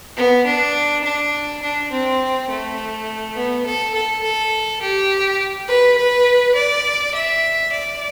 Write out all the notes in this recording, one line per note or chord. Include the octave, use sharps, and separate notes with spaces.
B3
D4
D4
D4
C4
A3
B3
A4
A4
A4
G4
B4
B4
D5
E5
D5